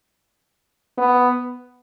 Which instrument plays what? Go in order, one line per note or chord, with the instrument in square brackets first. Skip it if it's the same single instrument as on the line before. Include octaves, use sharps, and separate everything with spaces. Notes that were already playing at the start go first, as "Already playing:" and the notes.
[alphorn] B3